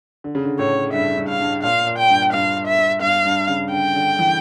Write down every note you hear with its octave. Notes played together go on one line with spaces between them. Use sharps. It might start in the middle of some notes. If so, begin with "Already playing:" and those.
D3
C#3
D3
A2 C#5
G2 E5
G2
F5
G2
A#2 F5
A#2
G5
G2
G2 F5
E5
G2 F5
G2
C#3
D3 G5
D3
E3